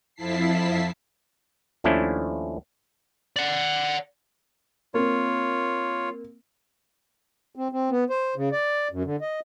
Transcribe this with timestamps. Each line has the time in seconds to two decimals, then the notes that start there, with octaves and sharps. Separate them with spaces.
0.15 F2 F3 E4 A5 B6 C7
1.84 D#2 F3 A3 C#4 D4 E4
3.36 D5 F#5
4.94 A#3 C4 F4 C#5
7.56 C4
7.72 C4
7.90 B3
8.10 C5
8.36 C#3
8.52 D5
8.92 F#2
9.05 D3
9.21 D#5